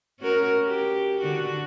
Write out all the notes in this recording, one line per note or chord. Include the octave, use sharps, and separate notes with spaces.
C#4 F#4 A#4
G4
D3 F#4